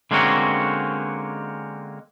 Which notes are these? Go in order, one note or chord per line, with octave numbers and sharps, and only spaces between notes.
D3 G#3 A#3 C4 C#4 F#4